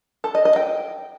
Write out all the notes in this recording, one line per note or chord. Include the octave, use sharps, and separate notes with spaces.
A4
D#5
D#5
G5